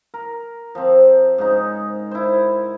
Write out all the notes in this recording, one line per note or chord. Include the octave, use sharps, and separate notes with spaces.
A#4
F3 C4
G#2 C#3 D#4
E4 C5